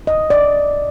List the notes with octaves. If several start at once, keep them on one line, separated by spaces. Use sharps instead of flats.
D#5
D5